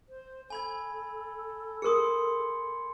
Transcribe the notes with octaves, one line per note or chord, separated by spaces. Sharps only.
C5
A4 G#5 B5 G#6
G#4 A#4 C6 D#6 C#7